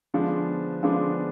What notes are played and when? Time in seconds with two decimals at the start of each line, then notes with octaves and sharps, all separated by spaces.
0.14 D3 F3 G#3 B3 D4
0.83 D3 F3 G#3 B3 D4